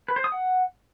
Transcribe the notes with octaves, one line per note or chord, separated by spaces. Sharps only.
B4
C5
D#6
F#5